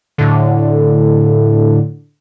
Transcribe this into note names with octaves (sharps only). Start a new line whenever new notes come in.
A2 D3